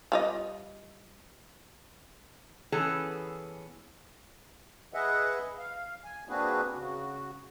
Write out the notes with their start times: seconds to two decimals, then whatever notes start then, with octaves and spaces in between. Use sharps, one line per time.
0.12 G3 F4 D#5
2.72 E3 B3 C#4 G#4 A4
4.94 G#4 B4 D#5 E5 F#5
5.58 F5
6.04 G#5
6.29 A#3 C4 D4 F#4 G#4 B4
6.75 C#3 F#4